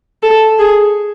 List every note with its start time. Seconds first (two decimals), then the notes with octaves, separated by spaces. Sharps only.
0.23 A4
0.59 G#4